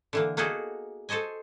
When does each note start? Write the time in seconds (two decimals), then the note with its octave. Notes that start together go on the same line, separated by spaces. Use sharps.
0.13 D3 E3 A#3
0.37 A#3 B3 D#4 F#4 G#4 A4
1.09 A4 C5 C#5 D#5 G#5